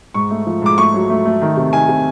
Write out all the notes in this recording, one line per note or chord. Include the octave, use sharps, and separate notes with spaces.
G#2 C#6
A3
F3
G#2 D6
A3 C#6
F#3
A3
A3
D#3
C3
D#3 G#5
C3